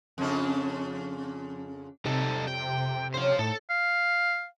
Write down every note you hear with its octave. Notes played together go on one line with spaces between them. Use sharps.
F2 C#3 D4
C3 G3 D#4 A4
F2 G5
D3 C4 C#4 C5 F5
A2 D#4 A4
F5